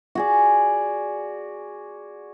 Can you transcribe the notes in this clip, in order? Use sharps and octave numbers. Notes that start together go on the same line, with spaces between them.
F#4 G#4 D5